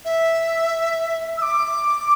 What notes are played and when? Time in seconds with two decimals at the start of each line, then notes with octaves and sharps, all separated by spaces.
0.05 E5
1.37 E6
1.42 D6